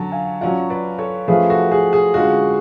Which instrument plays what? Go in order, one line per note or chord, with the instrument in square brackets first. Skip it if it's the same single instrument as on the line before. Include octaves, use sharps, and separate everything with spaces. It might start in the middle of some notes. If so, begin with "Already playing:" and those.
Already playing: [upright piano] D3 F#3 C#4 [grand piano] F#5 A5
[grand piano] F5 G#5
[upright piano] F#3 C#4 F4 [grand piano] D5 F#5
[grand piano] B4 D5
A4 C#5
[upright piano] F3 A3 C#4 F4 [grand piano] G#4 B4
[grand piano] F#4 A4
G#4
G#4
[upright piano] D3 G#3 C#4 F4 [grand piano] F#4